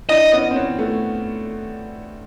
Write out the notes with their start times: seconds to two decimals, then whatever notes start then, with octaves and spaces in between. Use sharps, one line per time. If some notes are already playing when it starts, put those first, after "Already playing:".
0.09 D4 E4 D#5
0.32 B3 C#4
0.51 C4
0.56 B3 C#4
0.79 A3 B3